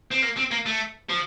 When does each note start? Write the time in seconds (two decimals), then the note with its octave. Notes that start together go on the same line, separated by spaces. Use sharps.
0.11 C4
0.22 A#3
0.37 C4
0.51 A#3
0.66 A3
1.10 F3